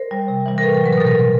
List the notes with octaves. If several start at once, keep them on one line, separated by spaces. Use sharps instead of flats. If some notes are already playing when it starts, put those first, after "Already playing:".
Already playing: A#4 C5
G3
C3
E3 G3
A#4
A2 A4 B4
A#4
F#3 B4
A#4
B2 A4
A#4
G3